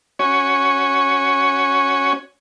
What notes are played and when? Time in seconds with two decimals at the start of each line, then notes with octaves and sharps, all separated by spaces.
0.19 C#4 F#4 C#5